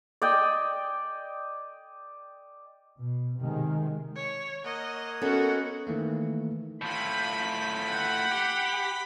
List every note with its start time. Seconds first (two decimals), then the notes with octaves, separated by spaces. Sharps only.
0.22 D5 D#5 G5 G#5
2.98 B2
3.39 C3 D#3 G#3
4.16 C#5
4.65 A#3 C#5 D#5 F#5
5.22 B3 C#4 F#4 A4 A#4 D#5
5.87 D#3 E3 A3 A#3
6.82 A2 F4 B5 G6
7.92 F#5
8.31 G4